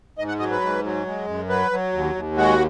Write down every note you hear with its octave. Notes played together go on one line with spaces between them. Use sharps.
G#2 D#5
F#5
F#3 D#5
B4
G#2
F#3
G#3
F#2
F#3 B4
F#3
D#2
D#2
G#3 F#4